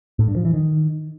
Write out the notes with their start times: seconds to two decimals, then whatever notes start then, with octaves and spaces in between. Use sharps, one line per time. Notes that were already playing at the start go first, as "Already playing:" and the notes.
0.19 A2
0.28 G2
0.36 F3
0.45 E3
0.54 D#3